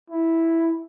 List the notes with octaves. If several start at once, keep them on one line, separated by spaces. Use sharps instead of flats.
E4